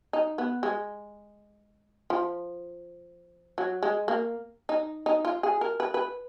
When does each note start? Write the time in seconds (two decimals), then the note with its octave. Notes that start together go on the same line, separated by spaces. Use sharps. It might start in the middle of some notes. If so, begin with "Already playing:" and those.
0.13 D#4
0.38 B3
0.63 G#3
2.10 F3
3.58 F#3
3.83 G#3
4.08 A#3
4.69 D#4
5.06 D#4
5.25 F4
5.43 G#4
5.61 A#4
5.80 B4
5.94 B4